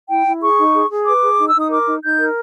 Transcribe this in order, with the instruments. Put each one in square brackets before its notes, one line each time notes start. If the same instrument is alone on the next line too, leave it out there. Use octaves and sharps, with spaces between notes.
[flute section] E4 G5
E4
G#4 C#6
D#4
G#4
G#4
B4 D6
G#4
D#4
E6
D#4
D#6
A#4 D6
D#4
D#4 G6
A#4